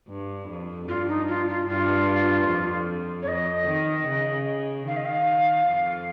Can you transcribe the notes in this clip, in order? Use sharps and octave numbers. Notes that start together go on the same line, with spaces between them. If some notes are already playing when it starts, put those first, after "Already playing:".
G2
F2
G2 F4
D#4
F4
F4
G2 F4
F2
C#5
F2 D#5
D#3
C#3
D#3 F5
D#5
F5
F2 F3